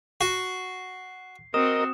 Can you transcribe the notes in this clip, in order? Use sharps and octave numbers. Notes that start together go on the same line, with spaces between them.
F#4 C7
C4 F#4 A#4 D#5 D#6 E7